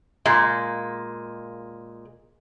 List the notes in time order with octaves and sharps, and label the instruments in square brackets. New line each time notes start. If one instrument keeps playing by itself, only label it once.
[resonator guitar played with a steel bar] A#2 G#3